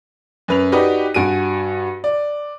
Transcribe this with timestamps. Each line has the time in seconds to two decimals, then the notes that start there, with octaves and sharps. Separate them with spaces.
0.48 F#2 B4 F7
0.72 D#4 F#4 G4 B4 D5 D#5
1.14 G2 F#4 G#5 D7 D#7
2.04 D5